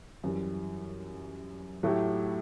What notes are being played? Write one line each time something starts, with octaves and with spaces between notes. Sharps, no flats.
F#2 E3 G3
A2 F#3 A3 E4 G4